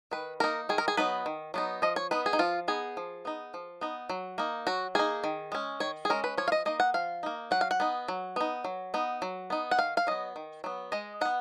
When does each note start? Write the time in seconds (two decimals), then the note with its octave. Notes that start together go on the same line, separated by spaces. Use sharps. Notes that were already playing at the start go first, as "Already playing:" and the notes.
0.11 D#3 B4
0.40 A#3 D#4 A#4
0.69 D#3 G#4
0.78 A#4
0.88 G#4
0.97 F#3 B3 D#4 B4
1.26 D#3
1.54 F#3 B3 D#4
1.82 F3 D#5
1.96 C#5
2.11 B3 D#4 B4
2.26 G#4
2.33 D#4
2.39 F3 F4
2.68 B3 D#4 G#4
2.97 F3
3.25 B3 D#4
3.54 F3
3.81 B3 D#4
4.10 F#3
4.38 A#3 D#4
4.67 F#3 F#4
4.95 A#3 D#4 G#4
5.24 D#3
5.52 G#3 C#4
5.80 D#3 C#5
6.05 G#4
6.10 G#3 C#4 A#4
6.24 B4
6.38 F3 C#5
6.48 F5
6.52 D#5
6.65 A#3 D#4 D#5
6.80 F#5
6.94 F3 F5
7.23 A#3 D#4
7.51 F#3 F#5
7.61 F5
7.71 F#5
7.80 B3 D#4
8.08 F#3
8.36 B3 D#4
8.64 F#3
8.94 B3 D#4
9.22 F#3
9.50 B3 D#4
9.71 F#5
9.79 D#3 F5
9.97 F5
10.07 F#3 B3 D#5
10.36 D#3
10.64 F#3 B3
10.92 G#3 D#5
11.21 B3 D#4 F#5